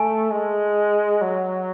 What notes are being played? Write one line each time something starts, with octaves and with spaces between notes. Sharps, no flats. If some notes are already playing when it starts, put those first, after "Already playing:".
Already playing: A3 G#5
G#3
F#3